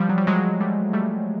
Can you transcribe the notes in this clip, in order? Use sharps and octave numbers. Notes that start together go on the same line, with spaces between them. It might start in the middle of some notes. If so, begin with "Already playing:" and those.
Already playing: F3 G3
F#3
G3
F#3 G#3
G3 A3
G3 A3